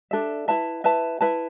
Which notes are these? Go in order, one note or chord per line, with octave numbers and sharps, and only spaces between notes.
D4 A4 E5
E4 B4 E5 A5
E4 B4 E5 A5
E4 B4 E5 A5